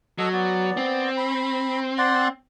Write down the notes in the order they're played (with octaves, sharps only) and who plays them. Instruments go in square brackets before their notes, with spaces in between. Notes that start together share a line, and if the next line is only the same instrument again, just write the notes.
[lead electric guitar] F#3 [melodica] A4 D#5
[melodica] B3 D5
[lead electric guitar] C4
[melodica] B5
D5 F#5 C6